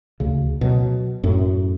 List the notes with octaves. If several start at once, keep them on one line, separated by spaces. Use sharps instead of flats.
D2 C#3
B2 F#3
F#2 A2